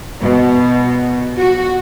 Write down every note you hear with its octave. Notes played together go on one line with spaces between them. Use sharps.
B2
F#4